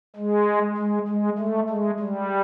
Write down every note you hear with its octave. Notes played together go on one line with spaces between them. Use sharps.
G#3
G#3
G#3
A3
G#3
G3